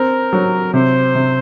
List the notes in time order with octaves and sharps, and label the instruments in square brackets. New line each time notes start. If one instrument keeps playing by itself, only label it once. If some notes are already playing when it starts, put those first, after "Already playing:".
Already playing: [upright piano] C4 [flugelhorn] A#4
[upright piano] F#3
[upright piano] C3 [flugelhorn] C5
[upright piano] C3